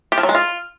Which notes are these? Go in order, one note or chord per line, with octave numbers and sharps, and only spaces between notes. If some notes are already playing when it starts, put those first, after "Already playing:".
G4
F3
F#3
G#3
F4